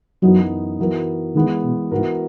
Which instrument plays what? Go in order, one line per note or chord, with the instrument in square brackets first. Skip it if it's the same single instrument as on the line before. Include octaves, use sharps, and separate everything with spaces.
[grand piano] F#2 E3 B3 D#4 [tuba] F#3
[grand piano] E3 B3 F#4 A#4 [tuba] F#3
[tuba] D#3 [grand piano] E3 G#3 B3
[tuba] B2
[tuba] G#2 [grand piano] E3 B3 F#4 A#4